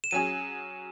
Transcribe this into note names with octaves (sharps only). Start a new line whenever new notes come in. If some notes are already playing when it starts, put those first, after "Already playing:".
E7
F#3 C#4 G#4 D#7